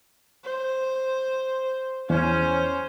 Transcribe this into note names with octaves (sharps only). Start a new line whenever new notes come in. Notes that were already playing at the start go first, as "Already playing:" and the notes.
C5
E2 C#4 C5